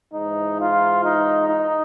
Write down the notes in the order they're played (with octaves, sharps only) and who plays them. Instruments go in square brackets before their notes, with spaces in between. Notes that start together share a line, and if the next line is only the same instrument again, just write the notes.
[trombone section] G#2 E3 D#4
F4
D#4
D#4